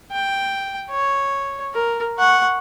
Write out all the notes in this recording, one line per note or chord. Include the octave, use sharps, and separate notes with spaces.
G5
C#5
A#4
F#5 C#6